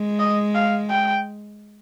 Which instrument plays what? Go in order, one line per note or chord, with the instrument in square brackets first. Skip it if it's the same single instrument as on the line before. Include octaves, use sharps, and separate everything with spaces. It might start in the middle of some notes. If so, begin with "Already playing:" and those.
Already playing: [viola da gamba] G#3
[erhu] D#5
F5
G5